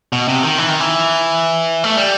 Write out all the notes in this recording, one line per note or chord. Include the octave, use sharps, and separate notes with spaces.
B2
C3
D#3
E3
D#3
E3
A3
G3